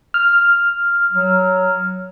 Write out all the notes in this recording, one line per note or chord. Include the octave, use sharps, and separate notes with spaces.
F6
F#3